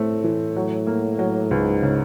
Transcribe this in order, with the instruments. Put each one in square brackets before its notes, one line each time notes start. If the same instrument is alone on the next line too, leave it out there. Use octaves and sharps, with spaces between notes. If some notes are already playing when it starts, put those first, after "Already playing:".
Already playing: [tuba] A2 [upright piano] A3 C4
[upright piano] E3
F#3
A#3
F#3
[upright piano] C#2 [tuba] G#2
[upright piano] C#3